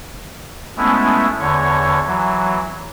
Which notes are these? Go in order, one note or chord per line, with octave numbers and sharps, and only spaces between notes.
G#3 A3 B3 C#4 E4
E2 D3 C#5
E3 F#3